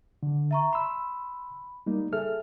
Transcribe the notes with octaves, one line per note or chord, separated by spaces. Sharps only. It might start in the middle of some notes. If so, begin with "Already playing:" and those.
D3
E5 A#5 C#6
B5 C6 E6
G3 A#3 D#4
G#4 A4 E5 F6